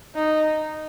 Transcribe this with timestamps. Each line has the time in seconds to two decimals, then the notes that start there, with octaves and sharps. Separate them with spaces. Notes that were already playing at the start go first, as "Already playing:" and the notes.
0.15 D#4